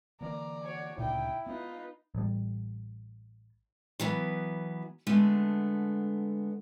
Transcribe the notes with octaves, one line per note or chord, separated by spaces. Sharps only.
D3 E3 A#3 D5 A#5
F#4 C#5
D2 A#2 C#3 D#4 E4 G5
B3 D#4 F4 B4
A1 G3
E3 F#3 B3
D3 G#3 A3 B3